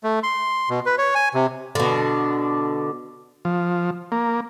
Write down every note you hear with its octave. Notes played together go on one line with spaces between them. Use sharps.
A3
C6
B2
B4
C#5
G#5
C3
B2 D3
F3
A#3